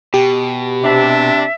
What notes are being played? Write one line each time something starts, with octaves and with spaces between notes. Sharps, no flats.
B2 G4
C3 D4 E5